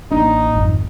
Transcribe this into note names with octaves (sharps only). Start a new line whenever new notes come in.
A1 A#3 D4 D#4
G#1 F2